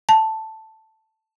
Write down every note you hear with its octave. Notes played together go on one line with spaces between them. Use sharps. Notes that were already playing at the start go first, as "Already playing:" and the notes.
A5